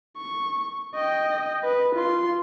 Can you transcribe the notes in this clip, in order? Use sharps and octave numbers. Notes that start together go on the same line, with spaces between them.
C#6
D#5 G5
B4
F4 C6